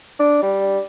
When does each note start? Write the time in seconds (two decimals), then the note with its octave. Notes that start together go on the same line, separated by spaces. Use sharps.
0.19 D4
0.42 G3